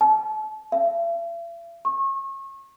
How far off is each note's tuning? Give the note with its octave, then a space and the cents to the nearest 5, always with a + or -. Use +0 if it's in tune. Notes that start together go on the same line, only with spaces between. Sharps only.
A5 -35
E5 +45
C#6 -35